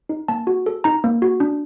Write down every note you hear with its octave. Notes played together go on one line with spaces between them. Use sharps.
D#4
A#3 A5
F#4
A4
D#4 A#5
A#3
F#4
D4